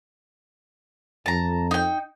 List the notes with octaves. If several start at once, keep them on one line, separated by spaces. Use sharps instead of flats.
F2 A5 A#5
D#4 G5